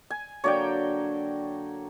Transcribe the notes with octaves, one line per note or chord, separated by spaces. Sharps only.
G#5
D3 F#3 A#3 C#5 D5 G5